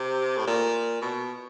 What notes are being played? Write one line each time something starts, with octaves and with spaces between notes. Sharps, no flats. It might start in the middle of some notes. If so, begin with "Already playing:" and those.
Already playing: C3
A2
A#2
B2